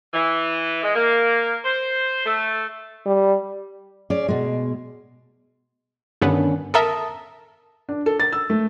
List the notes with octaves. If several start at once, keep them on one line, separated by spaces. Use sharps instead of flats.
E3
G#3
A#3
C5
A3
G3
C#4 G#4 D5
B2 G#3
G2 D3 D#3 B3 C#4 D4
A4 A#4 E5 A5 A#5 D#6
D4
A4
A6
E6
A3